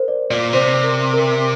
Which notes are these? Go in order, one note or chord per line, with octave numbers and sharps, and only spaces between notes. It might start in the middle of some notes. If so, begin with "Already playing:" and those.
Already playing: A#4 C5
D5
A#2 D5
C3 C5
A#4
A#4